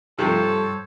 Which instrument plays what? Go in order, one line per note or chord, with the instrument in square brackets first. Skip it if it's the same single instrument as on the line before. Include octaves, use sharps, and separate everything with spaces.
[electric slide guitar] G2 [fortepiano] C3 F3 A3 [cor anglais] A4 [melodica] C5 C#5